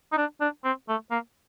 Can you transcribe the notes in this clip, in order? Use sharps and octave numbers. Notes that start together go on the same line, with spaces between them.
D#4
D4
D4
C4
A3
A#3